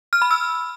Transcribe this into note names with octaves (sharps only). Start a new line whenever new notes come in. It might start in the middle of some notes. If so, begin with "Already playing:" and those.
F6
B5
E6